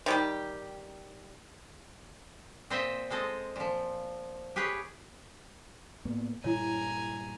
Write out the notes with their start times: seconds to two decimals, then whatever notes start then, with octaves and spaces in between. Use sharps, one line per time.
0.06 D#3 G3 G4
2.70 A#2 C4 C5 D#5 E5 G5
3.10 G#3 C4 A4 D#5
3.56 A#2 F3
4.56 G4 G#4 B4 C#5
6.05 A2 A#3 B3
6.44 G2 A#2 E3 E4 C#5 G#5 A#5